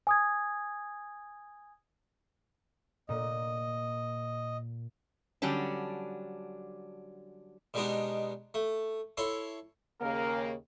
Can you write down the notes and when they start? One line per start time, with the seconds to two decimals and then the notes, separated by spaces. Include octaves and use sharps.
0.07 G#5 D#6 G#6
3.09 A#2 D#5
5.42 D3 F#3 G3 C#4 D4
7.74 B2 G3 G#3 B3 D4 D#4
8.54 A3
9.17 E4 A4 C#5 C6
10.01 D#2 C#3 A#3 A#4